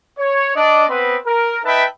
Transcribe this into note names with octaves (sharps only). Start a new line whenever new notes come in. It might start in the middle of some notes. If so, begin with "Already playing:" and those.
C#5
D4 D5 D#5
B3 C4 B4
A#4
D#4 B4 E5 G5 A5 B5